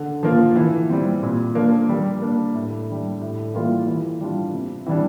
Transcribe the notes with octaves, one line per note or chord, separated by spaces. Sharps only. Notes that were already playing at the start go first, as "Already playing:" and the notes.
Already playing: D3
F3 A#3 F4
E3
G3 C4
A#2
F3 A#3 D4
G3
A#3 D4
A2
G3 D4
A2
E3 G3 A#3 F4
E3
G3 D4 F4
C3
E3 G3 D4